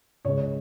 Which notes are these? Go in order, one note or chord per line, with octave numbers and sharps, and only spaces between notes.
C#2 C#3 G#3 C#5